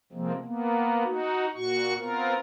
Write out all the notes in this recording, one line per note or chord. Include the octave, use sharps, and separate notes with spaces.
C3 F3 G#3 A#3 C4
A#3 B3
D#4 F#4
A#2 F#4 C#6
B3 C4 F4 A#4